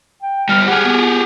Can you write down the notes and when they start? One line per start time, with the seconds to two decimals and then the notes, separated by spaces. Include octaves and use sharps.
0.22 G5
0.49 G3 B3 F6
0.68 G4 G#4 F#5
0.85 B3